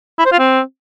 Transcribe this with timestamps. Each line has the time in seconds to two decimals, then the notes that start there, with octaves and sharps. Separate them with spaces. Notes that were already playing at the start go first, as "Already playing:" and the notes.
0.19 E4
0.25 C5
0.32 F4
0.39 C4